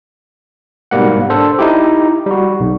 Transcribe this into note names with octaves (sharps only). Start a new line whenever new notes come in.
G#2 B2 G3 A#3 F#5
D4 A4 C5
D#4 E4 G4
G3 F#4
B1